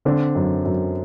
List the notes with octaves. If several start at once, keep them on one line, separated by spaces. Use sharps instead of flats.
D3 C4 D4
F#2
F#2